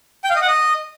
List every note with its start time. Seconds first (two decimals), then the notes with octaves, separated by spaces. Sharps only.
0.24 G5
0.30 F5
0.36 D#5
0.42 F#5
0.48 D#5